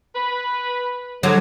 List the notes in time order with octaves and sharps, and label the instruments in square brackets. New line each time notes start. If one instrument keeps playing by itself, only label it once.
[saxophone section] B4
[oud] D3 F#3 [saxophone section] G#3